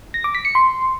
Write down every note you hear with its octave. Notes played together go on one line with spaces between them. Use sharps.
A#6
D6
B6
C#7
C6